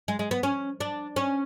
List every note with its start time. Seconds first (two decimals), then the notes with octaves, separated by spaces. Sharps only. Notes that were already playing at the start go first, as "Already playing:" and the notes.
0.08 G#3
0.19 G#3
0.31 B3
0.43 C#4
0.80 D4
1.16 C#4